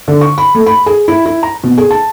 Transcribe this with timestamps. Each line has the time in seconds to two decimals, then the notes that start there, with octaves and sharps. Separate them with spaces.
0.08 D3
0.21 C#6
0.38 B5
0.54 A3
0.67 B5
0.86 G#4
1.08 E4
1.26 E4
1.43 A#5
1.64 B2
1.78 G#4
1.90 A5